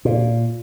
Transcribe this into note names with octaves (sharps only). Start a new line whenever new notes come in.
A#2